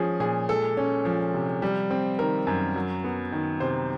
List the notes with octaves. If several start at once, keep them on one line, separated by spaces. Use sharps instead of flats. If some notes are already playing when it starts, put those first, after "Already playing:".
Already playing: F3 G#3 C#4 G#4
A#2 G#4
G#3 A4
C#4
F3
C3
G3
C4
D#3 A#4
F#2
F#3
B3
D#3
C3 C5